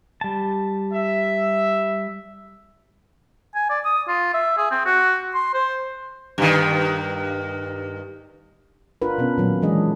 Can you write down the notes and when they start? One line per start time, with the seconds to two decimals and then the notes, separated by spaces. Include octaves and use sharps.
0.21 G3 A5
0.93 E5
3.55 G#5
3.70 D5
3.85 D#6
4.08 F4
4.34 E5
4.57 G#4
4.71 C4
4.86 F#4
5.34 C6
5.54 C5
6.38 G2 D#3
9.02 D4 F4 A#4 B4
9.18 B2 B3 C#4
9.38 A#2 D#3 F#3
9.62 E3 G#3 D4 G#4 D#5